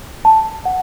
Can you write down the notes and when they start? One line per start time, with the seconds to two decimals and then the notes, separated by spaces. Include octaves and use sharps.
0.25 A5
0.65 F#5